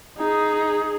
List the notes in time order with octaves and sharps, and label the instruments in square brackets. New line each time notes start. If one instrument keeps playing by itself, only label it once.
[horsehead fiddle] D#4 G#4